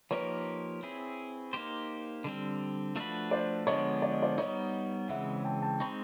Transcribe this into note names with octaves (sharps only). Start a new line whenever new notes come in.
F3 A#3 D#4 G4 A#4 B4 C#5
C4 E4 G#4
A#3 D#4 G4 C5
D3 G3 C4
F3 A3 D4 F#4 B4
C5 D5
D3 F3 G#3 B3 D4 C#5 D#5
D5
D#5
C5 D5
G3 B3 D#4 C#5 D#5
C#3 E3 G#3 C4 E5 F#5
G5 A5
G5 A5
G#3 C4 D#4 B5 C#6